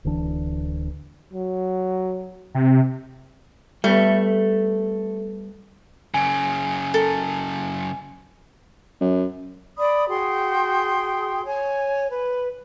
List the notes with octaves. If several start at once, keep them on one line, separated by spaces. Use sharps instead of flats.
D1 D2 E3 D4
F#3
C3
G3 A3 B3
F#2 C#3 G#5
A4 A#4
F#2
D5 B5 D#6
F#4 G#4 G5 C6
C#5 G#5
B4